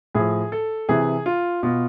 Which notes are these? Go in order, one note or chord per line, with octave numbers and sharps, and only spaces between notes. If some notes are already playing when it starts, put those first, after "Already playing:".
A2 F3 G#4
A4
C3 E3 G#4
F4
B2 F4